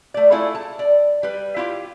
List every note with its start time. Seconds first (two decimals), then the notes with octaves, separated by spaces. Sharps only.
0.14 A3 D5
0.31 A3 E4 F4 G#4 A4
0.55 A5
0.79 D5
1.23 G3 B4
1.56 E4 F4 G4